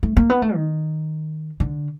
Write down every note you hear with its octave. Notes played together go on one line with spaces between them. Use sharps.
A3
A#3
B3
A3
D#3
D3